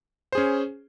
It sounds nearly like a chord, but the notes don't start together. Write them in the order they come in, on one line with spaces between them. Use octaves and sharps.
C5 G#4 C#4